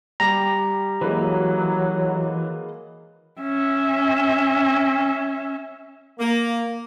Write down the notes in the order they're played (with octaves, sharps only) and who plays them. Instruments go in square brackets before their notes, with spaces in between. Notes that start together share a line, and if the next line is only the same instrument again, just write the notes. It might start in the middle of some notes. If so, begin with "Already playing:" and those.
[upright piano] G3 [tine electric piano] G4 A#5
[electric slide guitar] E3 [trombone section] F#3 [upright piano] G#3 A#3 B4
[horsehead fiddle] C#4 E5
[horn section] A#3